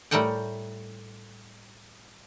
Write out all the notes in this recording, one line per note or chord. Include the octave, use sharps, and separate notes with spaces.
A2 G3 A3 A#4 F#5 G5